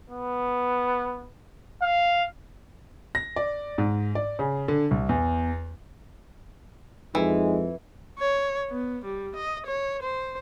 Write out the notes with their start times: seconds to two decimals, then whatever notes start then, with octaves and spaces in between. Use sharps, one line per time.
0.10 B3
1.82 F5
3.15 A#6
3.36 D5
3.78 G#2
4.15 D5
4.39 C#3
4.68 D3
4.91 C2
5.09 E2
7.15 F2 E3 G#3 D#4
8.19 C#5
8.70 B3
9.05 G3
9.35 D#5
9.66 C#5
10.02 C5